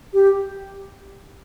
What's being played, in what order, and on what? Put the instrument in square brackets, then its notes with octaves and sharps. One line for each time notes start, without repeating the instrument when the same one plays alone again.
[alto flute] G4